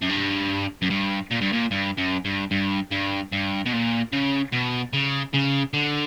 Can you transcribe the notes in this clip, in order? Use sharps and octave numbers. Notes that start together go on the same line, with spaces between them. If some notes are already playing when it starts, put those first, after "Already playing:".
F#2
G2
F#2
G2
A#2
G2
A#2
G2
F#2
G2
G2
G2
G2
B2
A#2
C#3
B2
C#3
C#3
D3